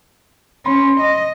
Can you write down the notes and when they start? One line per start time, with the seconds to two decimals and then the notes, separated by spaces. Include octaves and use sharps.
0.66 C#4 B5 C6
1.00 D#5